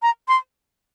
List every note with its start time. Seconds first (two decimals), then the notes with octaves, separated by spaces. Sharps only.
0.02 A#5
0.28 C6